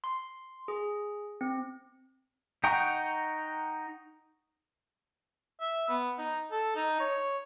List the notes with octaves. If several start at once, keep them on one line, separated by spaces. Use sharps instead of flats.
C6
G#4
C4
D#4 F#5 G5 A#5 C#6
E5
B3
D#4
A4
D#4
C#5